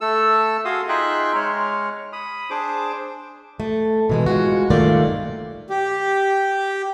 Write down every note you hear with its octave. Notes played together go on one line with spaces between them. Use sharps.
A3 A4 E6
F#4 G#4 F5 C6 D#6
D#4 F4 G#4 E5 G5 F#6
G#3 C#5 F6
B5 D#6
D4 G#4 C5 D6
A3
B2 E3 G#3
G#3 F4 F#4
G2 D#3 A3 A#3 F4 D5
G4